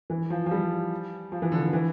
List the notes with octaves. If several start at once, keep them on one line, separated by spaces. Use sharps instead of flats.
E3
F3
F3
G3
F3
E3
D3
D3
E3